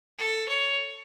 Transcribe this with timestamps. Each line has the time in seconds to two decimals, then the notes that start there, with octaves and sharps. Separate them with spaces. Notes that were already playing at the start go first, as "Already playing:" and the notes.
0.18 A4
0.48 C#5